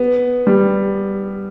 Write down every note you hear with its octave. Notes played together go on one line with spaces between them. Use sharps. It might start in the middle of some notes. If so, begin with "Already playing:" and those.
Already playing: B3
G3